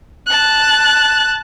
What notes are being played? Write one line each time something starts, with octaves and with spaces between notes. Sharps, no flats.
A5 F#6